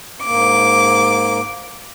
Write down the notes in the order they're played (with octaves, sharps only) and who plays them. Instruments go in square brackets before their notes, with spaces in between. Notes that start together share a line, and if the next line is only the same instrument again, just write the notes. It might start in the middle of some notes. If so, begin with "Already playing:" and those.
[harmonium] G#2 A#3 [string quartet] D6